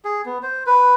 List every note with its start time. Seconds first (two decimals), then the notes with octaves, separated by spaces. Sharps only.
0.05 G#4
0.26 B3
0.43 C5
0.66 B4